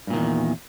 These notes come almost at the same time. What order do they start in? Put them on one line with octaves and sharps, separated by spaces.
G2 A#2 D#3 E2